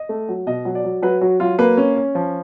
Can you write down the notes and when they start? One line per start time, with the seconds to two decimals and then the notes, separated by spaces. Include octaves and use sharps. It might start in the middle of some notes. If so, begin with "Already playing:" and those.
Already playing: D#5
0.09 A3
0.29 F#3
0.47 B2 D#5
0.65 F#3
0.75 D5
0.84 F#3
1.02 F#3 B4
1.21 F#3 F#4
1.40 F#3 F4
1.58 A#3 B4
1.77 C#4
1.96 C#4
2.15 F3